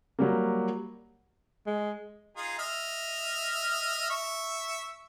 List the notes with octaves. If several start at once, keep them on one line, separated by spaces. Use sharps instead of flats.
F#3 G3 A#3
G#3
D#4 F4 G#4
D#5 E5 F6
E5 C#6 E6